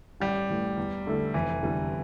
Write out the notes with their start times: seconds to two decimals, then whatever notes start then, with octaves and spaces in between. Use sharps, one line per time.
0.20 A1 G3
0.49 A2 E3 A3
0.77 E2
1.06 D3 A3 E4 A4
1.34 F1 E3
1.63 E2 D3 G3